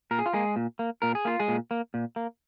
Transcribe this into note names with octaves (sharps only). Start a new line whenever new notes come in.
A#2 A#4
G#4
F4
G#3 A#3 G#4
A#2
A#3
A#2 A#4
G#4
A#3 F4
G#3 G#4
A#2
A#3
A#2
A#3